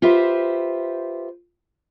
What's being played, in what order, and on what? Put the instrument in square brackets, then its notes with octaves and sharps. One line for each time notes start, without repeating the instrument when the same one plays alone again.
[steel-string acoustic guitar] F4 G4 B4 C5 E5